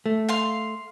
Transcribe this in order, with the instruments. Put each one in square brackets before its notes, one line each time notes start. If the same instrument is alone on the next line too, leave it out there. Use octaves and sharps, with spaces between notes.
[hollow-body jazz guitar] A3
[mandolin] F5 C6